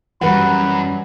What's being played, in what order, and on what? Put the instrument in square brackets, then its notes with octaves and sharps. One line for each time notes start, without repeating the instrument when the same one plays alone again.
[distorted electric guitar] F#2 [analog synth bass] E3 [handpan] G3 B4 F#5 [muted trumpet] B5